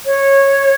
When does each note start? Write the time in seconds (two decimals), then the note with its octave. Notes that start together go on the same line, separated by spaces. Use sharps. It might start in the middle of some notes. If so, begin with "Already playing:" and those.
0.06 C#5